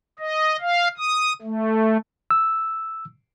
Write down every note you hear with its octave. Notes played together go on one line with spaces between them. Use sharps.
D#5
F5
D#6
A3
E6